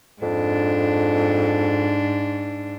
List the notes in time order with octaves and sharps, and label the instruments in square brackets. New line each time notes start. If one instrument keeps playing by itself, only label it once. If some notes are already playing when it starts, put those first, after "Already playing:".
[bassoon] F2 [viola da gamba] G#2 D4